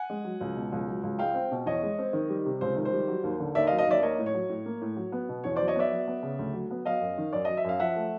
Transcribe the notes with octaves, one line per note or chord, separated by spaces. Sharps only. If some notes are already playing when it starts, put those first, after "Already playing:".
Already playing: F#5 G#5
G#3
F#3
C#2
B2
C#2
F#3
C#2
G#3 F5 G5
C4
B2
E2 C#5 D#5
G#3
C4
D#3
G3
C3
C#2 C5
D#3
C5
G3
F#3
D#2
D3
D#2 D5 E5
D#5 F5
F#3
D#5 F5
D#2 D5 E5
A#3 C#5 D#5
A2
C#5
F#3
A2
A#3
A2
F#3
B3
B2
E2 C#5
C5 D5
F#3
C#5 D#5
B3 D5 E5
F#3
B3
C#3
D2
F#3
B3
F#3 D#5 F5
F#2
D#3
F#2 D5
F#3 D#5
E5
F#2 F5
F3 E5 F#5
A3